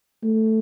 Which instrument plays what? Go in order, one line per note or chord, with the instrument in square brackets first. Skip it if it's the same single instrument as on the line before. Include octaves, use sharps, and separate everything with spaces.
[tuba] A3